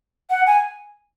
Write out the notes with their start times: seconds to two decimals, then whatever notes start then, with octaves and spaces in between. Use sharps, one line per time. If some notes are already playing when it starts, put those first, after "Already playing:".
0.30 F#5
0.47 G#5